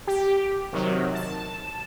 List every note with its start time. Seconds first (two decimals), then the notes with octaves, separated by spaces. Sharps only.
0.07 G4
0.73 C3 D#3 F#3
1.15 A5